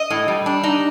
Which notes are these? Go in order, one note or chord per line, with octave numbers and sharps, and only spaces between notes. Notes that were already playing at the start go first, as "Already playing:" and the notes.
Already playing: D#5
A2
G3
D4
D#4